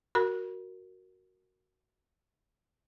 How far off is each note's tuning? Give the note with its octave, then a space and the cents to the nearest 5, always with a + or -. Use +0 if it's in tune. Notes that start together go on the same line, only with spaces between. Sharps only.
F#4 +0 A#4 -5 B5 -35